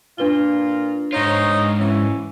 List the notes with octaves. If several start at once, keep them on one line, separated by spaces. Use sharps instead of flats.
A#2 D4 F4 B4 G7
G#2 D#4 F4 C#5
E3 C#4